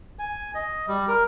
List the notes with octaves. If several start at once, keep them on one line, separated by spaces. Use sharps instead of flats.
G#5
D#5
G3
A#4